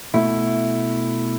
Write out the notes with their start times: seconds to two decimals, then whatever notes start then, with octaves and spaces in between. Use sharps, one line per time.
0.14 B2 A3 E4